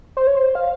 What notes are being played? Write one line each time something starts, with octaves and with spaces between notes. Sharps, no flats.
C5
C#5
C5
F5